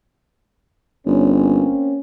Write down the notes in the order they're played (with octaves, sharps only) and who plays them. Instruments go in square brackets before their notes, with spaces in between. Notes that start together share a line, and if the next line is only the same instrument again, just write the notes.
[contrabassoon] G1 [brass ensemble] A#3 C4 C#4